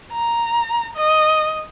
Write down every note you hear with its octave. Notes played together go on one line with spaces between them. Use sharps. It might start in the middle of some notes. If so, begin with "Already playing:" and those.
A#5
D#5